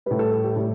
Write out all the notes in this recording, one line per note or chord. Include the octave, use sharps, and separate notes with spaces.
A2 G3 B4
A4
A4
G4
A2 G3